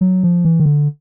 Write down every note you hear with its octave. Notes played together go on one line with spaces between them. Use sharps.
F#3
F3
E3
D#3
D3